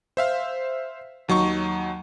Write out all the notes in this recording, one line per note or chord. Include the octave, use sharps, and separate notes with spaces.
C5 E5 F5
D#2 F#3 D#4 C#6